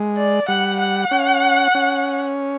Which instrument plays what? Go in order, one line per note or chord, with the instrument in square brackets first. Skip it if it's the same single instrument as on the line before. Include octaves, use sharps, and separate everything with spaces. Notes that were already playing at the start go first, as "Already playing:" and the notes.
Already playing: [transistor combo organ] G#3
[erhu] D5
[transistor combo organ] G3 [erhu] F#5
[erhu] F#5
[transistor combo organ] C#4
C#4